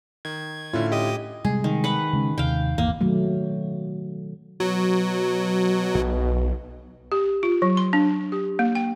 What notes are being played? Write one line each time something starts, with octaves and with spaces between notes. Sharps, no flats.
D#3 G#6
A2 D3 C#4 E4 F4
G4 D#5 D#6
C3 G3 G#3 G#4
D#3
B4 F#5
C#3 G#3 C#4
D#2 C3 F5 G5
G#1 E2 A#3
B2 D#3 F#3 A3
B2 F#3
B1
G4
F4
F#3
C6
D4
G4
A#3
G5